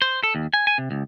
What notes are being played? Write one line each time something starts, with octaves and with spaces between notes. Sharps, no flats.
C5
A4
D#2
G#5
G#5
C3
C#2